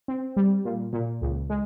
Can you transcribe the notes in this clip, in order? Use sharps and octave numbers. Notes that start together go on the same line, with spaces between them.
C4
G3
A#2
A#2
C#2
G#3